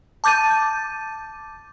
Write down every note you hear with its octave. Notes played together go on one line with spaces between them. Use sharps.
A5 D6 G6 A6 D#7